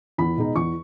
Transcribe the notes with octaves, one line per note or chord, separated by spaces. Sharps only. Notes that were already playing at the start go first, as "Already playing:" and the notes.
E2 B5
B2 G#3 D#4
E2 C#6